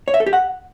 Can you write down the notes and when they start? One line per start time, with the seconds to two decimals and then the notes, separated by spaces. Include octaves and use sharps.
0.08 C#5
0.14 E5
0.20 A4
0.26 G4
0.33 F#5